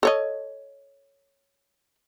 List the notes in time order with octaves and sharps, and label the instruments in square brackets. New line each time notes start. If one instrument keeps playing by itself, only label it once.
[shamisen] A4 C#5 D#5